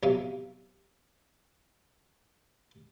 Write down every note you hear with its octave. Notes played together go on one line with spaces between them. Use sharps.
B1 C3 E5 F5